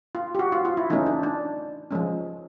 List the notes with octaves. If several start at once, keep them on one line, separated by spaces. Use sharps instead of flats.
F4
G4
F#4
F4
F4
E4
E3 A3 C#4 D#4
D4
D4
F3 G#3 C#4